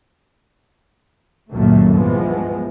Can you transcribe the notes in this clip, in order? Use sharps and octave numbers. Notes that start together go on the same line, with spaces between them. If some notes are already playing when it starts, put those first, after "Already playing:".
C#2 F#2 A#2 D#3 A3 A#3
G2 E3 F3 G#3 B3